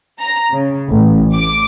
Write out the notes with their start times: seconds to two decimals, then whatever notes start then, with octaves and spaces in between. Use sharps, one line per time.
0.20 A#5
0.52 C#3
0.90 A1
1.34 D6